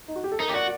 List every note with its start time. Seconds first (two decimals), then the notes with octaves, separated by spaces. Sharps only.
0.08 D#4
0.16 F#4
0.24 G4
0.32 A4
0.39 D#4 A#4
0.49 G4
0.54 F#4 D5